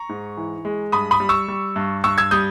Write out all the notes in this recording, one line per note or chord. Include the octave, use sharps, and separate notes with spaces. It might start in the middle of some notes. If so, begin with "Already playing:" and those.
Already playing: A#5 C#6
G#2
E3
G#3
G2 B5 D#6
B5 D#6
G3
C#6 E6
G3
G2
G2 C#6 E6
E6 G#6
G3 D#6 G6